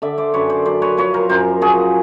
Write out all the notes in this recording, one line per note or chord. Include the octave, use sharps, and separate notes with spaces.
D3 D5 E5
C5 D5
F#2 B4 C#5
C5 D5
F#2 C5 D5
B4 C#5
F3 B4 C#5
A#4 C5
F#2 A#4 C5
F3 F#4 G#4